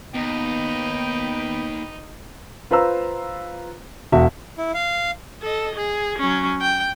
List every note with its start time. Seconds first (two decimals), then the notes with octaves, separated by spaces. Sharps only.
0.14 D#2 B3 D#4 B4 G5
2.71 F4 B4 C5 A#5 E6
4.12 E1 F#4 E5
4.58 E4
4.74 F5
5.42 A4 D#5
5.76 G#4
6.19 F#3 C#4
6.61 G5